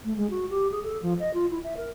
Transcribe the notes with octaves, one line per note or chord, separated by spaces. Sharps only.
A3
G#3
F#4
G4
G#4
A4
F3
D#5
F4
E4
E5
A#4